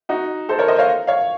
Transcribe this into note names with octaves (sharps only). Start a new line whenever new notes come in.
D#4 F#4
A4 C5
A#4 C#5
C5 D#5
C#5 F5
C#5 F5